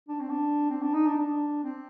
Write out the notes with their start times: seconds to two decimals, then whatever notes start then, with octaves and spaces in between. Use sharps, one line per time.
0.08 D4
0.20 C4
0.30 D4
0.70 C4
0.82 D4
0.94 D#4
1.06 D4
1.18 D4
1.64 C4